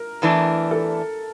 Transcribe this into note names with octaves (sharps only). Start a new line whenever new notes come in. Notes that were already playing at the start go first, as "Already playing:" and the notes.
Already playing: A#4
E2 E3 A3 D4
A4